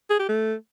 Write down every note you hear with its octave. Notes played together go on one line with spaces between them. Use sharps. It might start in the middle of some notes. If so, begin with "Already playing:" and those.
G#4
G4
A3